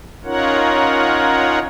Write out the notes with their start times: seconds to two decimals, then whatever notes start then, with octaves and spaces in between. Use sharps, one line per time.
0.24 C#4 D#4 F4 A#4 C#5 F#5